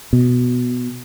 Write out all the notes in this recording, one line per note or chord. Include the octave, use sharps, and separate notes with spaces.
B2